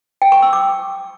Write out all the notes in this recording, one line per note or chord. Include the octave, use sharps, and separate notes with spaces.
G5
C#6
E6
D6